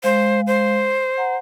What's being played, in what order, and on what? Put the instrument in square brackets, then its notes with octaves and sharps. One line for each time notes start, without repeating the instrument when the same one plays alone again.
[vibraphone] G#3 F5 [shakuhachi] C5
[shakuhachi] C5
[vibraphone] F#5 A#5